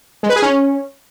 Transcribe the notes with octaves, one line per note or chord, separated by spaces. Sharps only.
G#3
B4
G#4
C#4